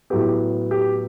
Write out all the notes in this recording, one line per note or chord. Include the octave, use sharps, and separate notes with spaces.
A2 F#3 B3 G4
G4